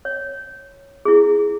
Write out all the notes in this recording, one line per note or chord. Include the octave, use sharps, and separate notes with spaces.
C#5
E4 G#4